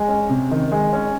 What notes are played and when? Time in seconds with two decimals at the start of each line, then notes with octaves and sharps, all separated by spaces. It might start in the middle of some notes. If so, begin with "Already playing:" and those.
Already playing: G#3
0.09 C#4
0.29 C3
0.51 D#3
0.72 G#3
0.93 C#4